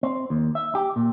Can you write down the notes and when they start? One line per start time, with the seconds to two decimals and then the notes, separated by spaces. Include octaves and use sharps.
0.03 C4
0.30 D#2
0.55 E5
0.75 G4
0.96 A#2